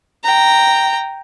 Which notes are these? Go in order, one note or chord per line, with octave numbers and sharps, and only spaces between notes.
G5 A#5